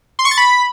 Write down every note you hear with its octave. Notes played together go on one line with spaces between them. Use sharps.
C6
C#6
A6
B5